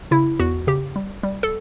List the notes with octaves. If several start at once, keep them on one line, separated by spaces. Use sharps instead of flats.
C#3 E4
E2 F#4
C#3 G4
G3
G3
A4